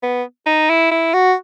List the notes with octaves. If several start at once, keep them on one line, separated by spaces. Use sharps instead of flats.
B3
D#4
E4
E4
F#4